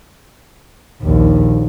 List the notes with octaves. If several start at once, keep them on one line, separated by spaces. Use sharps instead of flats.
A#1 D#2